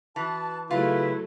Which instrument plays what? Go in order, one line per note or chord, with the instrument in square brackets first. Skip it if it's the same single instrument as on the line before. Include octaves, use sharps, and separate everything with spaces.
[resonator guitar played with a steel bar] E3 [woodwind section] F#4 B4 A5
[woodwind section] C#3 B4 [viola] F#3 A3 [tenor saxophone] E4 [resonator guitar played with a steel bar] F4